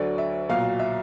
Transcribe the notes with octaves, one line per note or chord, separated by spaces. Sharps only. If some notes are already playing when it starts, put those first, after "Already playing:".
Already playing: D2 D3 F#3 D5
E5
B1 A#2 F#3 F5
E5